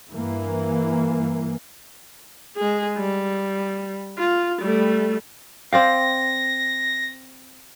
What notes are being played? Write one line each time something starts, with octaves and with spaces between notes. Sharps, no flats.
G2 E3 A#3
G#3 G#4
G3
F4
G3 A3
C4 D5 F5 G5 A#6